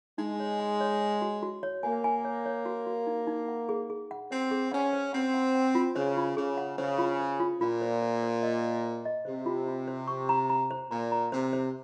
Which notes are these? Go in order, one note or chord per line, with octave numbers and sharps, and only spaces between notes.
G#3 D#4
C#5
G#5
C#5
C#5
F#4
F#4
C#5
A#3 G#5
G#5
C#5
C#5
F#4
F#4
D#4
D#4
F#5
G#4
G#4
F#5
C4 C5
G#4
C#4 F#5
C5
C4 F#5
F#5
F#5
F4
C#3 C5
F4
C#3 G#4
F#5
C#3 C5
F4
C5
F4
A#2 F4
C5
C5
C5
D#5
D#5
C5
D#5
C3 C5
F4
F4
C5
C#6
A#5
A#5
C5
A#2 A#5
A#5
C3 C5
C5